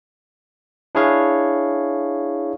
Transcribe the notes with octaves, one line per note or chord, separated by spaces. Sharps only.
D4 E4 G#4 C#5 F5